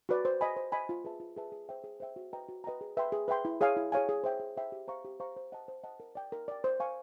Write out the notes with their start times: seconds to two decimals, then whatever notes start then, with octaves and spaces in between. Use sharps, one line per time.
0.09 F#4 B4 D5
0.25 C5
0.41 D#5 G#5 B5
0.57 C5
0.72 D#5 G#5 B5
0.89 F4
1.05 G#4 B4 E5 A5
1.20 F4
1.37 G#4 B4 E5 A5
1.52 G#4
1.69 C5 E5 G5
1.84 G#4
2.00 C5 E5 G5
2.16 F#4
2.33 B4 D#5 G5 A#5
2.49 F#4
2.64 B4 D#5 G5 A#5
2.81 G#4
2.97 B4 E5 G5 C6
3.12 G#4
3.28 B4 E5 G5 C6
3.45 E4
3.61 G#4 C#5 F5 G#5
3.77 E4
3.92 G#4 C#5 F5 G#5
4.09 G#4
4.24 C5 E5 G5
4.40 G#4
4.57 C5 E5 G5
4.72 G4
4.88 C5 F5 A#5 C#6
5.05 G4
5.20 C5 F5 A#5 C#6
5.37 C5
5.52 D#5 F#5 A5
5.68 C5
5.84 D#5 F#5 A5
6.00 A#4
6.15 D5 G5
6.32 A#4
6.48 D5 G5
6.64 C5
6.80 F5 G#5 C#6